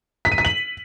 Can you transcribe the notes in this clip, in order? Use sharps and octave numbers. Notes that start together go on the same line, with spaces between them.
B6
D#7
B6
F#7